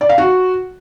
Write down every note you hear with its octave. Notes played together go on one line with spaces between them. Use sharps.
D5
F5
F#4